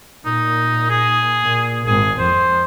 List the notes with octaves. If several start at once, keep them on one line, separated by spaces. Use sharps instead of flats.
A#2 D#4
G#4
A#2
G#1 G#4
F2 C5